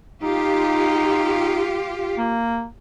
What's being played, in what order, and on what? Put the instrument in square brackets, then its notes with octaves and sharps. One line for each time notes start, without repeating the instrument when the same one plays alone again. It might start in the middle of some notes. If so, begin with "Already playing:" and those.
[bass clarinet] D#4 [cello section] F4 G4
[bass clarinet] A#3